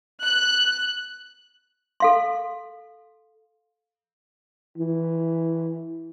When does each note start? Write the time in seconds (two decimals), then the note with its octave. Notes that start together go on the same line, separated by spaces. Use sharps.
0.23 F#6
2.00 A4 F5 C6
4.78 E3